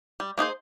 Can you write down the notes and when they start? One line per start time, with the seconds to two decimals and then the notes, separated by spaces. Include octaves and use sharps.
0.20 G3
0.38 A#3 D#4 G#4 C5